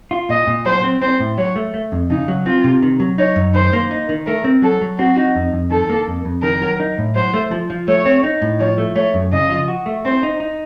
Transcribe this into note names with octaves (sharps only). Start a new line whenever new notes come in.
F4
A#2 D#5
A#2
F#3 C5
C4
C4 C5
A2
F#3 C#5
A3
A3
F2
C#3 D#4
F#3
C4 F4
C3
D#3
F#3
D#4 C#5
F#2
D#3 C5
A#3
D#4
D#3
A3 A#4
C4
F#3 A4
F#3
C4 F#4
D#4
F2
F2
D#3 A4
A#3
F2
F2
D#3 A#4
F#3
D#4
A2
F#3 C5
A3
F3
F3
A3 C#5
C4
D#4
A2
F3 C#5
A3
A3 C#5
F#2
C#3 D#5
F3
F#4
A3
C4 C5
D#4
D#4